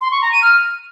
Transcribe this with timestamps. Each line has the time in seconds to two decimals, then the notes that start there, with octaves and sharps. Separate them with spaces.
0.01 C6
0.12 C#6
0.22 A#5
0.32 D#7
0.42 F6